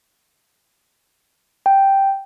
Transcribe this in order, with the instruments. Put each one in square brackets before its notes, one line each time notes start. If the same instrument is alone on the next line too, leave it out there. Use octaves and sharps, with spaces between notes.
[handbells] G5